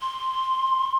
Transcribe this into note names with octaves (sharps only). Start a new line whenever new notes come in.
C6